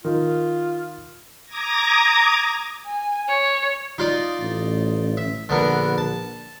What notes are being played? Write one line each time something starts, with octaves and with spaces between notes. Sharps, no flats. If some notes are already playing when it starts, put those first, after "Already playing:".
D#3 F4
A#5 D6 D#6 G#6 A#6
G#5
C#5
D#4 F4 D5
A1
E5
A#1 D3 B3 A#4
A5